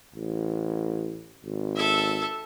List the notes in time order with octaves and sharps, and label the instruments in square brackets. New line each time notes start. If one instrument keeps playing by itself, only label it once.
[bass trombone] A1
G#1
[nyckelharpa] A4 E5